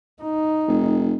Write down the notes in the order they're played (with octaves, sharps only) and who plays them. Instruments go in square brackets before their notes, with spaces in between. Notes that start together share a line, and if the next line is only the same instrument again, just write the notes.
[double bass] D#4
[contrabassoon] F1